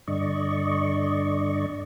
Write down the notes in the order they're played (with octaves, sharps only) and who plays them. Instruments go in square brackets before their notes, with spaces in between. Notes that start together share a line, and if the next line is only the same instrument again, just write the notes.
[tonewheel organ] G2 D3 D5 D#5 C#6